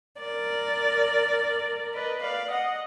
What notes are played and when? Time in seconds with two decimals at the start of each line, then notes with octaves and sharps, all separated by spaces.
0.20 A#4 D5
1.94 B4 D#5
2.22 D5 F5
2.51 D#5 F#5